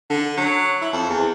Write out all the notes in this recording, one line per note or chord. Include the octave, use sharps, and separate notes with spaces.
D3
F#3
E4
F2
E2